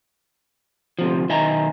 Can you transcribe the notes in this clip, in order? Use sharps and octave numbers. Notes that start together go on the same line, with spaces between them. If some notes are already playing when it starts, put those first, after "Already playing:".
D2 C3 F3
B1 D#3 D#5 E5 G#5 A#5